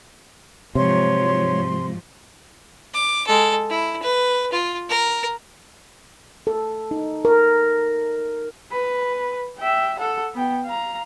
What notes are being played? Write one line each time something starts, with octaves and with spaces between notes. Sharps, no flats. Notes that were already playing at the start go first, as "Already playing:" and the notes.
G#2 C3 F3 F#3 C#5 C6
D6
G#3 A4
E4
B4
F4
A#4
A4
D#4
A#4
B4
E5 G5
A4 F#5
B3 G5
F5 A#5